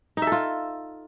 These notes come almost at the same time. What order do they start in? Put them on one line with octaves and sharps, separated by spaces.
D#4 E5 A4 F4